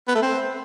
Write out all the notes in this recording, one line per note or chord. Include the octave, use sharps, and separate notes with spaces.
B3
A3
C4